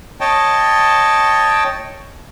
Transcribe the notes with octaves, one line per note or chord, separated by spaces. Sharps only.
C#5 D#5 G5 A5